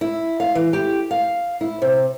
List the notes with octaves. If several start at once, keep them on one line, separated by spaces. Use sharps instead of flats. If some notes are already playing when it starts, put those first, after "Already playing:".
E4
F5
E3
G4
F5
E4
C3